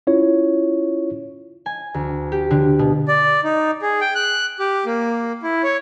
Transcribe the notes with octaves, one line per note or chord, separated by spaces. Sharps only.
C#4 E4 F4 C#5
G#5
D2
G4
D3
B2
D5
D#4
G#4
G5
F#6
G4
A#3
E4
C#5